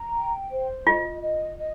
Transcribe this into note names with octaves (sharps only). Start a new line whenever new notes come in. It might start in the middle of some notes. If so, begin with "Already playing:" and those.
Already playing: A#5
G5
C5
F4 D#5
D#5
D#5